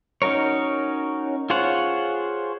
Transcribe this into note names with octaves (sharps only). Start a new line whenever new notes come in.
C#4 D#4 F#4 A#4 C#5
F4 G#4 C5 C#5 F#5